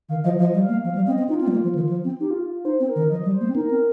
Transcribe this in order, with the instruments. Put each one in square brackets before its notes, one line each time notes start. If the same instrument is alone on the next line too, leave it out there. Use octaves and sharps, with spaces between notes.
[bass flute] D#3 [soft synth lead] F5
[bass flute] F3 [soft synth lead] D#5
[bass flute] F3 [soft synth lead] D#5
[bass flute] G3
[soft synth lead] F5
[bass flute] A#3
[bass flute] F3 [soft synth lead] F5
[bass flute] G3
[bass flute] C4 [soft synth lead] D#5
[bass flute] C4
[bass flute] D#4 [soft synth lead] F4
[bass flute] C4
G3
A#3
F3
D#3
F3
C4
[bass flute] D#4 [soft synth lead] G4
[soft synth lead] F4
F4
F4
[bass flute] D#4 [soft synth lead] C5
[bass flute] C4
[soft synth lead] A#4
[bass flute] D#3
[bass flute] F3 [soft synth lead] D#5
[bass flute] G3
[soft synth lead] C5
[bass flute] A#3
C4
[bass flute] D#4 [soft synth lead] A#4
[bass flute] C4